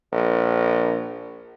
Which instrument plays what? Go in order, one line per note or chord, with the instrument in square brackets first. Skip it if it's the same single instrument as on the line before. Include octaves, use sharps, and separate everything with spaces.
[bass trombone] A#1